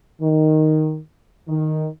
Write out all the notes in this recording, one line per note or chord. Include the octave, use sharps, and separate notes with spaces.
D#3
D#3